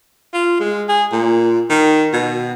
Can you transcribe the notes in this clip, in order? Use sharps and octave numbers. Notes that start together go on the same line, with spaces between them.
F4
G#3
G#4
A#2
D#3
B2